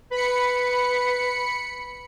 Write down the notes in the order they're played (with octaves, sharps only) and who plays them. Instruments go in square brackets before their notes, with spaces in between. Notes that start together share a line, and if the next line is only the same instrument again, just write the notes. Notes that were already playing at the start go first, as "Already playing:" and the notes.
[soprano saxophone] B4 [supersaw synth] B5 C#7